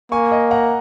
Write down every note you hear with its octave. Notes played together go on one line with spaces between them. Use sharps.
A#3 G#5 C#6
D#5 G#5
F#5 A#5